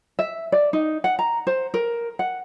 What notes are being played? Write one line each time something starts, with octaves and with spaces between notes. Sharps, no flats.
E5
D5
D#4
F#5
A#5
C5
A#4
F#5